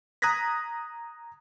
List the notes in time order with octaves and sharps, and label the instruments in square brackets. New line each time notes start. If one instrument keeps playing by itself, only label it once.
[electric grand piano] A#5 D#6 F#6 G#6 A#6 B6